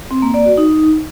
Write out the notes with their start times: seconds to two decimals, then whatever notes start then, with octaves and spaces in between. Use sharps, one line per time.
0.11 C4
0.22 A#3
0.34 D5
0.46 F#4
0.57 D#4